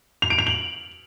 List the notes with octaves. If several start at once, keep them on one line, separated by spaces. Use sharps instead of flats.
F7
D7
F7
F#7